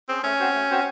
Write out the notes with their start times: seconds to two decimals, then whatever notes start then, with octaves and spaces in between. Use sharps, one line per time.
0.09 C4 C#4 G#4
0.24 A3 C#4
0.39 C4 F#4 C5
0.54 A3
0.70 C4 F#4 C5